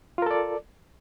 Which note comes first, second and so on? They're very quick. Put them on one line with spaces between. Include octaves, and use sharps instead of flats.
F4 A#4 A4 D5